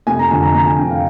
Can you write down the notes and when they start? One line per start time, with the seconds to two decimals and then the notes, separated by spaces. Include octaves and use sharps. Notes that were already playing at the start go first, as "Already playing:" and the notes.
0.07 F1 G#5
0.19 A#5
0.30 F2 D3 G#5
0.43 A#5
0.54 F1 A#5
0.66 G#5
0.79 F2 G5
0.83 D3
0.90 F5